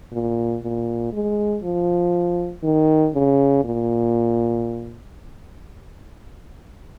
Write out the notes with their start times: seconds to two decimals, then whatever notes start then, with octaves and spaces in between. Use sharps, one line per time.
0.12 A#2
0.63 A#2
1.13 G#3
1.63 F3
2.63 D#3
3.14 C#3
3.64 A#2